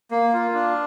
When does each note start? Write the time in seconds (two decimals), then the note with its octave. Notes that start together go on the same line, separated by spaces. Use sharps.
0.11 A#3
0.33 F4
0.54 D4